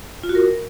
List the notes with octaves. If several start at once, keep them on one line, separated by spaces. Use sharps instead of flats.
F4
F#4
A#4